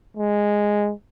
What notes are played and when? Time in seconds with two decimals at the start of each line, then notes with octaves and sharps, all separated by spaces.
0.17 G#3